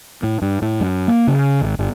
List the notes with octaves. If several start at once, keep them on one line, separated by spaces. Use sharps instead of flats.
A2
G2
A2
F#2
A#3
C#3
G#1
G1